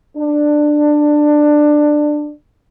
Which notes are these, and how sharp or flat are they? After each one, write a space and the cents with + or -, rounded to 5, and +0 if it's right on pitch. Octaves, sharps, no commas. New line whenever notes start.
D4 +15